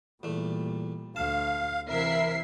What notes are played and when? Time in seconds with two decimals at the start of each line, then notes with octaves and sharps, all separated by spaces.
0.23 E2 A#2 G3 A3
1.16 D2 F5 A5
1.89 C3 E3 E4 A#4 E5 C7